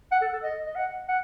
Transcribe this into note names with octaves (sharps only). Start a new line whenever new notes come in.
F#5
A4
A4
D#5
D#5
F#5
F#5